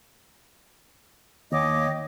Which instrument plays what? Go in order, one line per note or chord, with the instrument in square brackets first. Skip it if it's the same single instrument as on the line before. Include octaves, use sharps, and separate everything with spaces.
[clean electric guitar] D#2 [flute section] C#5 D#5 D6